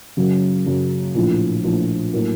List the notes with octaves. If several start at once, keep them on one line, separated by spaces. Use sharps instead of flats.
F#2 C#3 F#3
F#2 C#3 F#3
A#1 A2 F3
A#1 A2 F3
A2 F#3 A#3